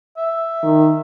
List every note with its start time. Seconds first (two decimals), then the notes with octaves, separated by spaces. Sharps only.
0.17 E5
0.63 D#3